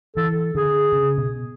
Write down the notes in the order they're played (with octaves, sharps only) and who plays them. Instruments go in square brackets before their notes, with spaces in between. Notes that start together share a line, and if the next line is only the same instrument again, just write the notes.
[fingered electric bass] E3 [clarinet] A4
[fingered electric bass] D3 [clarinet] G#4
[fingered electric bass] C#3
B2